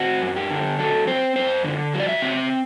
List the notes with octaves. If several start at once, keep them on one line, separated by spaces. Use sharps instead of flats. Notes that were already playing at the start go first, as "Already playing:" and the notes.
Already playing: C4 F#4
F#2
G4
D3
F#3 A4
C4 C5
F#2 C5
D3
F#3
D5
E5
C4